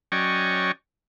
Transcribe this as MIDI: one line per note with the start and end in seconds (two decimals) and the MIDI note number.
0.12 0.72 54
0.12 0.72 61
0.12 0.72 74
0.12 0.72 75
0.12 0.72 79
0.12 0.72 85